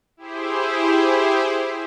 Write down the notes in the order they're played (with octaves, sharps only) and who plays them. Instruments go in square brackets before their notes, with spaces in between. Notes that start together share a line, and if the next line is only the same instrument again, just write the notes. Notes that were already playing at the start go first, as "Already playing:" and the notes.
[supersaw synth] E4 G4 G#4 C5